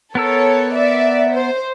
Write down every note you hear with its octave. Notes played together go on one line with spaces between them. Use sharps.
B3 A4 A#4 C#5 E6
D5 E5
C5